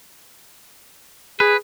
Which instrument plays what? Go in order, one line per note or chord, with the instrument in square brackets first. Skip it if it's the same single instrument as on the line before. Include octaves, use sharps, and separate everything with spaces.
[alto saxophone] G#4 [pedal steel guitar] B4